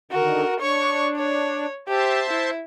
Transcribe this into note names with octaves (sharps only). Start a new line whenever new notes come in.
D3 D#3 F#4 A#4
D4 C#5 C#6
C#5
G4 C5 E5 A5
E4